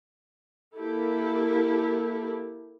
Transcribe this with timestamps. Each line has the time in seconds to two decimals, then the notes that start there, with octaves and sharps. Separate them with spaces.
0.75 A#3 E4 G4 A4